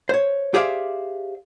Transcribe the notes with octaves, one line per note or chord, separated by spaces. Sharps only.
C5 C#5
G4 G#4 C5 D5 E5 F5